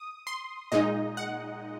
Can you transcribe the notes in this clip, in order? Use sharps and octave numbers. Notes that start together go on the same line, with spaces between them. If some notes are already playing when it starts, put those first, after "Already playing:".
Already playing: D#6
C6
A#2 G#3 D#4 D#5
F#5